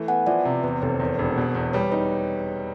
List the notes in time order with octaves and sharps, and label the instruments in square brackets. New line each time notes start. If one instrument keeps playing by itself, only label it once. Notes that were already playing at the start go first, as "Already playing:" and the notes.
Already playing: [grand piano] E3 A3
[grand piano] B3 [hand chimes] F#5 G#5
[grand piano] F3 [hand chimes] D5 E5
[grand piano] C3
[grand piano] E2 [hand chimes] B4
[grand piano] F1 [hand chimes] C#5
[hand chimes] C5
[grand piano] E2 [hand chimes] B4
[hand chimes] A#4 C5
[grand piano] E1
B2
E2
[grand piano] G3 [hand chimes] B4 C#5
[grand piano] D#4 [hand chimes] B4 C#5